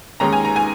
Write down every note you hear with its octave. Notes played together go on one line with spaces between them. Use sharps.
D#2 D#3 G#3 C#4 A#5
G#5
A#5
G#5